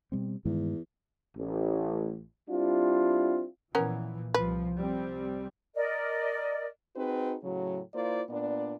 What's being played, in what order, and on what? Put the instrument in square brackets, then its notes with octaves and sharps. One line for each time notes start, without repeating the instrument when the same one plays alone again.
[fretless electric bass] B2 G3 C4
[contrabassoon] E2 [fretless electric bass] G2 D#3 G#3
[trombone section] A1
G3 C4 D4 E4 F4
[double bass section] A#2 E3 F3 [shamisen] B3 C#4 A#4
[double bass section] C2 F3 [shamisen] B4
[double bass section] C2 G3 C4
[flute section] A#4 D5 D#5
[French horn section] C4 D#4 F#4 G#4 B4
A2 C#3 F#3
A#3 E4 F4 C5 D5
A#2 B3 D4 D5